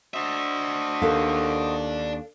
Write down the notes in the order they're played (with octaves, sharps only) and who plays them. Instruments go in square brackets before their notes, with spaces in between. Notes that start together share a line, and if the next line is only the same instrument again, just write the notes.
[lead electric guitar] D4 E5 [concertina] F#4 C5 D#5
[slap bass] D#2 [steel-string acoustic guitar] A4 A#4 F5